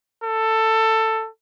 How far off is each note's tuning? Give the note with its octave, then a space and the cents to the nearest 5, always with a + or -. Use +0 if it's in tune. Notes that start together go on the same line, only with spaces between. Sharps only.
A4 +15